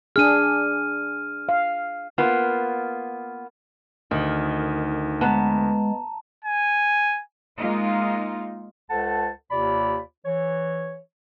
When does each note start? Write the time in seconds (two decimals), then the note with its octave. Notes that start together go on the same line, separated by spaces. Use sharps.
0.16 D4 G#4 F6 D#7
1.49 F5
2.18 A#3 B3 F4
4.11 D2 D#3
5.21 G#3 B3 A5 A#5
6.44 G#5
7.58 G#3 A#3 D#4 F4
8.90 C#2 A4 C5 F#5 A5
9.51 D#2 C3 F4 D5 B5
10.25 E3 C#5